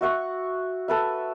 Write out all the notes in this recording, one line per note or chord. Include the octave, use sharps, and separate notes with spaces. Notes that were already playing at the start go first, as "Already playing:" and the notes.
F#4 E5 F#5 C#6
A4 B4 E5